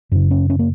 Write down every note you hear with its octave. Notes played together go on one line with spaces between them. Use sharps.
F#2 C#3 C#4
C#4
C#4
A#3